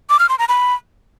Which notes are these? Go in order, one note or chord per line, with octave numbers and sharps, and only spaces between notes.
D6
F6
C6
A#5
B5